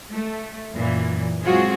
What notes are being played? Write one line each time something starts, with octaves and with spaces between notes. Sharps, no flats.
A3
F#2 A#2 E3
F#3 G#3 C4 F4 F#4 G#4